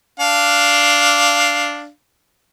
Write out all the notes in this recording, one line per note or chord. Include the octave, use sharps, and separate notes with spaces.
D4 F5